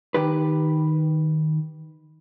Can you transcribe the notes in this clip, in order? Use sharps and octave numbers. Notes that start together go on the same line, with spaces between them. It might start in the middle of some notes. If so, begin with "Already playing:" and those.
D#3 G4 B4